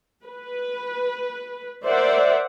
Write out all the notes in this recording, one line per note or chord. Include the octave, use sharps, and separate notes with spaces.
B4
A#4 C5 D5 E5 F#5